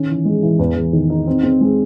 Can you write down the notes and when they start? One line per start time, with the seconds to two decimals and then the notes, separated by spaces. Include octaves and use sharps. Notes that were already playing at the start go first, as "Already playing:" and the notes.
Already playing: D#3 C#4
0.09 E3
0.25 G#3
0.43 E3
0.59 E2
0.76 E2
0.93 D#3
1.10 D#4
1.27 C4
1.43 C4
1.61 G#3